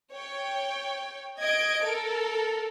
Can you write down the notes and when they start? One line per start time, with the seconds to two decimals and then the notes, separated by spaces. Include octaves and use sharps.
0.13 C#5 G5
1.39 D#5 G#6 D7
1.86 A4 A#4